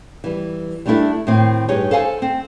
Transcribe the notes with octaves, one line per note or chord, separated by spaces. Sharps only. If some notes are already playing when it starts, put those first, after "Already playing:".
E3 G3
G3 A3 B3 D4 E4 A4
A2 D#3 C4
G2 D#4 G4 G#4 C#5
A4 C5 F5 F#5 G#5
C4